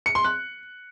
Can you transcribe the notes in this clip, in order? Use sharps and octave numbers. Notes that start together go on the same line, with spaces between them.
C#7
C6
F#6